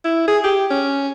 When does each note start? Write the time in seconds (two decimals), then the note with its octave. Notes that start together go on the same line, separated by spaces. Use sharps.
0.04 E4
0.28 G#4
0.44 G4
0.70 C#4